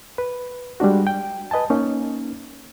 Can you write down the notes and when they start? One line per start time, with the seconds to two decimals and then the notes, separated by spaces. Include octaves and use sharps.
0.18 B4
0.80 G3 G#3 D4 F#4
1.07 G5
1.51 B4 D#5 G#5 A5
1.70 A#3 C#4 D#4